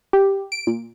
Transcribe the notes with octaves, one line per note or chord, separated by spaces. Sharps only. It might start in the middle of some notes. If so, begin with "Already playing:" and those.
G4
D7
A#2